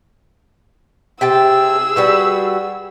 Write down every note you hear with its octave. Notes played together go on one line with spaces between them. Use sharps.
C3 G#4 G5 A5 E6
G3 F#4 B4